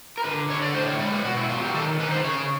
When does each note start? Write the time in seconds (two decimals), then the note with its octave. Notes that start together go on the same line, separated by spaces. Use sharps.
0.18 A#4
0.24 D3 B4
0.49 D3 C#5
0.62 D5
0.74 A2 C5
0.86 C#5
0.99 G#3 D5
1.12 B4
1.24 B2 F#4
1.37 E4
1.49 F#3 F4
1.62 G4
1.74 D#3 A4
2.00 D#3 B4
2.11 C5
2.24 C#3 C#5